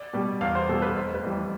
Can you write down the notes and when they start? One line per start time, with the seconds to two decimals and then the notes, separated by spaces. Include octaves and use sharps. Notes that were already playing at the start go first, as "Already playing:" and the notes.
Already playing: D5
0.13 B2 G3
0.41 E2 F5
0.55 C5
0.69 B2 G3 A4
0.82 B4
0.96 F1 C5
1.14 B4
1.23 F2 E3 G3